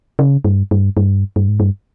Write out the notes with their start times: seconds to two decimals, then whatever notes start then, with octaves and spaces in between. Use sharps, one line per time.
0.19 C#3
0.45 G2
0.71 G2
0.97 G2
1.36 G2
1.48 G#2
1.60 G2